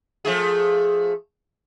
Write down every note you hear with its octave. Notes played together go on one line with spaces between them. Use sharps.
F3 A3 G#4